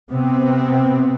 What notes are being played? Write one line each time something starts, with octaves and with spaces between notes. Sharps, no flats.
C3 B3 C4